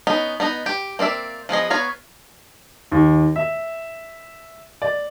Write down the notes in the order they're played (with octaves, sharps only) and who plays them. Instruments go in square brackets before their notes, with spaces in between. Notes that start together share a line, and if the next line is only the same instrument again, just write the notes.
[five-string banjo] B3 C#4 D#4
B3 D#4 D#5
G4
A#3 C4 D5 E5
F3 B3 G#4 D#5
B3 C#5 F5 A#5
[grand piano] D#2
E5
D5